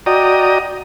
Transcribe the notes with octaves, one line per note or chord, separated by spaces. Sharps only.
F#4 D5 D#5 G5 A#5 D#6